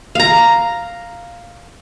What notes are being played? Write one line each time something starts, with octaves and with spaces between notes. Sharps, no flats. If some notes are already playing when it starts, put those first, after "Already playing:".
F5 A#5